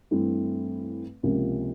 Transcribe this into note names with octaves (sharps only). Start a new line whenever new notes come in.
G2 E3 A3 C4
C#2 C3 F3 A#3 C#4